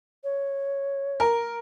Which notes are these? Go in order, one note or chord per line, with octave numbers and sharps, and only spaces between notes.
C#5
A#4